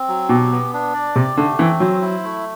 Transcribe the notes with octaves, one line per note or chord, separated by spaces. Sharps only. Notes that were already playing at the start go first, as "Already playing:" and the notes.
Already playing: C4
F#3
B2 G4
B3
D4
D5
C3 G4
D3 A3
E3 C4
F#3 C5
E4
A3